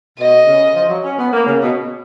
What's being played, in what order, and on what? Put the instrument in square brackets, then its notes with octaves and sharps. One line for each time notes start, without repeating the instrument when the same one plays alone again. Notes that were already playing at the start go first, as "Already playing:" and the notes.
[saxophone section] B2 [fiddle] D#5
[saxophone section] C#3
F3
F#3
C#4
B3
A#3
C#3
B2